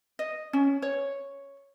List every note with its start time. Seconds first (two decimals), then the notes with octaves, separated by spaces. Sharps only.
0.19 D#5
0.53 C#4
0.82 C#5